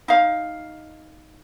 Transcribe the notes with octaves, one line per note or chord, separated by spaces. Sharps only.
D#4 F5